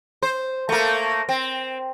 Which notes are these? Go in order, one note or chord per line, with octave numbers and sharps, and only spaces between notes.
C5
A3 A#3
C4